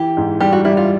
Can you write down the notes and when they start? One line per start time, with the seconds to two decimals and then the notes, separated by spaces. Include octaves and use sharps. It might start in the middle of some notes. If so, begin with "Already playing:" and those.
Already playing: E3 G4
0.17 G#2
0.40 G3 G4
0.53 F#4
0.65 G3 E4
0.77 F4